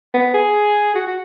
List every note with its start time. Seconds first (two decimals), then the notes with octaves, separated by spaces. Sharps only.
0.14 B3
0.34 G#4
0.95 F#4
1.07 F#4